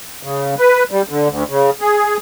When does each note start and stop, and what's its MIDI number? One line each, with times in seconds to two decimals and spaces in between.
0.23 0.55 49
0.58 0.84 71
0.91 1.02 55
1.09 1.28 50
1.28 1.43 38
1.49 1.70 49
1.81 2.17 68